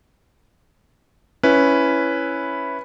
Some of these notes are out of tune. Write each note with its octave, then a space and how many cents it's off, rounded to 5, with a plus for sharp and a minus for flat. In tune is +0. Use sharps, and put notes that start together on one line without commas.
C#4 +0 E4 +0 B4 +0